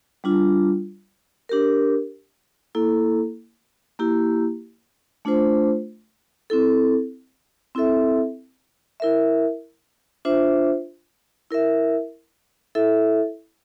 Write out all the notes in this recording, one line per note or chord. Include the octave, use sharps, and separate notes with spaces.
G3 D4 F4
D4 G4 A#4
A#3 E4 A4
A#3 E4 G4
A3 D4 F4 C5
C4 E4 A4
C4 E4 A4 E5
E4 A#4 E5
D4 F4 C5 E5
E4 A#4 E5
E4 A4 E5